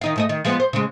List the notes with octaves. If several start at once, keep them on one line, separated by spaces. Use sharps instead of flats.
D#3 D#4 F5
G#2 A3 D#5
D#3
F3 G#3 B3
C5
C#3 G#3